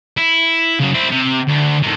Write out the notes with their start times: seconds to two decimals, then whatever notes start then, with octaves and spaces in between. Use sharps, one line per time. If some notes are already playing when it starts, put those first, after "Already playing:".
0.17 E4
0.80 C#3 F#3
0.94 C4 E4
1.10 C3
1.47 D2
1.82 A2 D#3